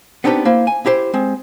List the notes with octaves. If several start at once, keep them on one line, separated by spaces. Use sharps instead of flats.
B3 C4 D4 D#4 G4 B4
A#3 E4 C5
G#5
E4 G4 C5
G#3 C4